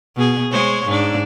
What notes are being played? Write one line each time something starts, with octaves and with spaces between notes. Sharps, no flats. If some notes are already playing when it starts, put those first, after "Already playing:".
B2 G#4
G#3 C5 C#5
G#2 D4